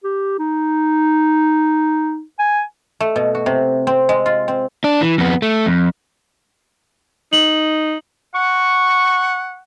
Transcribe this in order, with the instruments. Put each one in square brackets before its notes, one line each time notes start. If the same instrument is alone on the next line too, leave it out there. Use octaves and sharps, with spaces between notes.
[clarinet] G4
D#4
G#5
[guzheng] A3
B2
F#4
C3
C4
G#3
F4
C4
[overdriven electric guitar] D4 D5
E3
F2 B3
A3
F2
[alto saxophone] D#4 [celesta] F#7
[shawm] F#5 [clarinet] C#6